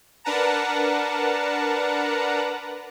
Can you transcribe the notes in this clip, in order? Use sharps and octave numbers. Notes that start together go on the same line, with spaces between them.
D4 A#4 B4 F#5 A5 A#5